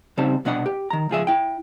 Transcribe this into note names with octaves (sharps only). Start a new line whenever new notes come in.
C#3 G3 C4 D#4 C5 A5
C2 B2 B3 D4 D#5 F#5
G4
D#3 A#5
C#2 F3 G#4 E5
E4 G5